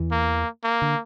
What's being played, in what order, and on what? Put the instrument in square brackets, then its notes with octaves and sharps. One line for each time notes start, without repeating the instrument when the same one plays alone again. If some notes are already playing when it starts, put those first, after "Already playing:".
Already playing: [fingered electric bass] E2 E3
[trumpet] A#3
A#3
[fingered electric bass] D3